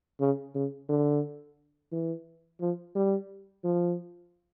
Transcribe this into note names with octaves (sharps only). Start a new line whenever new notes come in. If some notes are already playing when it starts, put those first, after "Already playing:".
C#3
C#3
D3
E3
F3
G3
F3